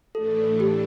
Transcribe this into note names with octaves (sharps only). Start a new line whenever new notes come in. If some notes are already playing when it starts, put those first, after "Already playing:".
A2 E3 A3 D4 A4
G4